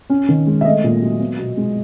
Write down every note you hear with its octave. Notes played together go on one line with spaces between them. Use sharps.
C#4
D#3
G#3
E5
A3 D#5
A#2
F#3
B3
B2
G#3